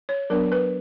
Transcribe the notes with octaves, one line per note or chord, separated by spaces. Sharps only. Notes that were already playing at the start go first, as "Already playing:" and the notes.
C#5
F#3 B3 D4 A#4
B4